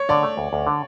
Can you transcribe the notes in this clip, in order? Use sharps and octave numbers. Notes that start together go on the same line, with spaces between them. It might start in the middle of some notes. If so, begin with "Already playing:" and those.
Already playing: C#5
D3 D5
A3
D2
D2
D3